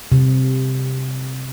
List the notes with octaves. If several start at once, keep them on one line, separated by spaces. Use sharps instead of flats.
C3